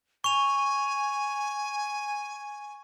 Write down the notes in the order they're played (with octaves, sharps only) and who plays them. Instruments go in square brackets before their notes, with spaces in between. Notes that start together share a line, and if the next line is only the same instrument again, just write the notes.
[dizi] G#5 [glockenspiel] C#6 F7